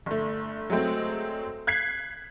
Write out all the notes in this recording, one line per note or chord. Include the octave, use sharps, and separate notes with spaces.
G1 A3
F#3 G#3 A3 C4
F#6 G#6 B6 C7